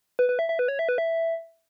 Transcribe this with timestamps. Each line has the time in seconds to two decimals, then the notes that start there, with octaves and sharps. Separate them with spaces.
0.19 B4
0.29 B4
0.39 E5
0.49 E5
0.59 B4
0.68 C#5
0.79 E5
0.89 B4
0.98 E5